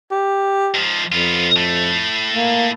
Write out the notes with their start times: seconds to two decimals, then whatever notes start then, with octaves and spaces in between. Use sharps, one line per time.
0.11 G4
0.74 G#2 F3
1.12 F2 B3 F4
1.56 A2 A3
2.34 A#3